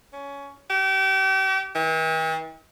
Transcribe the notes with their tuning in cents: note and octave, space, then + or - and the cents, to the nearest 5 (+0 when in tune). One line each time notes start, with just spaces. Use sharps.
C#4 +15
G4 -35
E3 -45